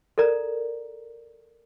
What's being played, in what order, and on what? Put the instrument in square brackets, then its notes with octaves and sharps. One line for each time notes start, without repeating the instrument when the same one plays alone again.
[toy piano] A4 A#4 D5 A#5